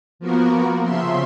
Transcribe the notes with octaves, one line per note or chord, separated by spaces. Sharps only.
F3 A#3 B3 F#4 A#4
C#3 F3 E5 C6